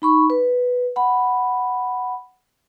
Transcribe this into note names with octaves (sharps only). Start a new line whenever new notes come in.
D#4 B5 C#6
B4
F#5 B5